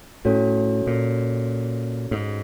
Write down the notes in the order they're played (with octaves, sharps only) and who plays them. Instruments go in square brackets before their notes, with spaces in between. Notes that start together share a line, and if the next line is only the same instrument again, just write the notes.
[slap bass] A2 [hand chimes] C#4 F#4 A4 C#5
[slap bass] A#2
G#2